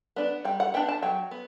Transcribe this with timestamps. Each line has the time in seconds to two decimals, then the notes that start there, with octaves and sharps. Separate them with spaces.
0.16 B3 D4
0.44 G3 G5
0.60 F#5
0.74 B3 D4 G5
0.89 A5
1.03 F#3 G5
1.31 B3